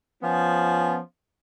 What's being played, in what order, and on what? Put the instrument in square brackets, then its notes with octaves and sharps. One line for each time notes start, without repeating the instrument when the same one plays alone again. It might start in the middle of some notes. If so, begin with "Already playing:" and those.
[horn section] F3 B3 C#4